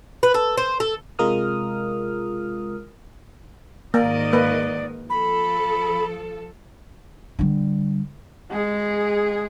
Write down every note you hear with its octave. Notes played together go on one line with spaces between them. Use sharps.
B4
A4
C5
A4
C3 G#3 F4 A#4 D#6 F6
G#2 D#3 A#3 D5 D#5
A#3 B4
F3 A4 B5
D3 G3
G#3 G#4